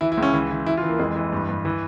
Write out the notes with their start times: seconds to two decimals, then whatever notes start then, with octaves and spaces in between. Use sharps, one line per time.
0.01 E3 E4
0.12 E4
0.17 C#2
0.23 C#4
0.34 E3
0.51 E3
0.66 E3 E4
0.77 F4
0.83 E3
0.88 A#3
0.99 F2 G#3
1.16 E3
1.32 G2
1.49 G2
1.65 E3